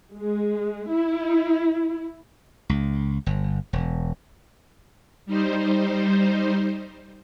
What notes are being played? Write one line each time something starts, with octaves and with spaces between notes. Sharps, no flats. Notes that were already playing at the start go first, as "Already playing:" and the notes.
G#3
E4
C#2
G1
E1
G3 D#4 C5